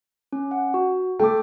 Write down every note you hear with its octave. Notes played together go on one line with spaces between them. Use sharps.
C#4
F#5
F#4
A3 G5 D6